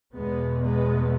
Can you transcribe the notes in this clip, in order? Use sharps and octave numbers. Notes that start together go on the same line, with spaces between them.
E2 B2 G#3 B3
G#3 B3